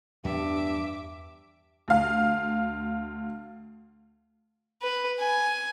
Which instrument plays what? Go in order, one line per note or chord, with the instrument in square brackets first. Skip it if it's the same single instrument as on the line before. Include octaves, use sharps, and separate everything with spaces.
[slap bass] E2 G3 [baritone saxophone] G2 [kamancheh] E5 D6
[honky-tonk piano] D2 F5
[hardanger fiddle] B4
G#5